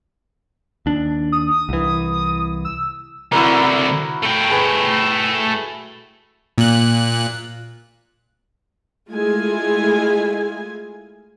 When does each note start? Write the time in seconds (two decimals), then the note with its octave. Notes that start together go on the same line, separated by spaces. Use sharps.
0.86 D#2 D4
1.32 D#6
1.69 C2 E3
2.65 E6
3.32 C2 D3 E4 F#4 A#4
4.23 A3 G5
4.49 G#4 B4 G#5
6.58 A#2 F#6
9.10 G#3 A3 E4 F4 G#4 G#5